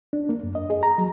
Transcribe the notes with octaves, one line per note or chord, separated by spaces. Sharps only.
D4
A#3
F#2
D#5
G#4
A#5
F#3